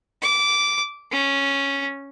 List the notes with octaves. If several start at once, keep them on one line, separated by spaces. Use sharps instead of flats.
D6
C#4